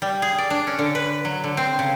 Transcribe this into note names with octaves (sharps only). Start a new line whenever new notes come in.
G3
G#4
D5
D4
C#4
D3
B4
F#3
D3
C4
C#3